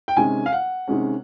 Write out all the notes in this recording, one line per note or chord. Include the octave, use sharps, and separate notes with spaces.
G5
C3 D#3 G#3 C#4 G#5
F5
F#5
C3 D#3 G#3 C#4